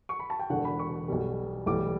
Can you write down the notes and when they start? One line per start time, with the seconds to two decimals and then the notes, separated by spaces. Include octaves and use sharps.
0.09 C#6
0.19 B5
0.30 A5
0.39 G5
0.50 E1 E2 D3 F#5
0.65 B5
0.79 C#6
1.08 B1 B2 G3
1.66 B1 A2 E3 G3 D6